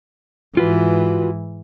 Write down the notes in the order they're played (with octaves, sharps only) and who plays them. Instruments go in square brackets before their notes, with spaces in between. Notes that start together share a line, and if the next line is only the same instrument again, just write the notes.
[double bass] G#2 E3 [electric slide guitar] F4 F#4 B4